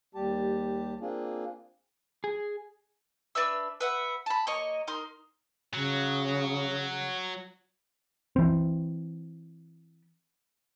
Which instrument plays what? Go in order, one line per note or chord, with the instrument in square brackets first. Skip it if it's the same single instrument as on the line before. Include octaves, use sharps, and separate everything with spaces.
[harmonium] D#2 G3 G4 A5
A#3 C4 D4 F4 G#4
[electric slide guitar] G#4
[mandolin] D4 B4 E5 E6
B4 E5 F#5
A5 B5
A#3 C#5 D#5 C#6
D#4 A#4 C6
[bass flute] C#3 [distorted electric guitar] F#3
[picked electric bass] E3 C4